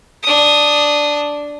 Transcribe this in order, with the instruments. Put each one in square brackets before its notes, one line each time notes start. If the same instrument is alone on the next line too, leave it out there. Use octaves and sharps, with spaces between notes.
[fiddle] D4 D#6